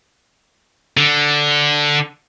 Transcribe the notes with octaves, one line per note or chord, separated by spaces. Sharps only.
D3